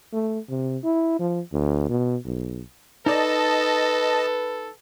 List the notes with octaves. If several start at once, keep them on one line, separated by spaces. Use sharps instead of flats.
A3
C3
E4
F3
D2
B2
B1
D#4 A4 B4 D5 D#5 A5